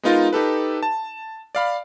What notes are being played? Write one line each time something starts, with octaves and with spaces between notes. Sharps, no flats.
G#3 B3 D#4 F4 A#4
D#4 G4 A4 B4
A5
D5 F5 B5